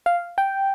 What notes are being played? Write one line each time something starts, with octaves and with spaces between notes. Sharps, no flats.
F5
G5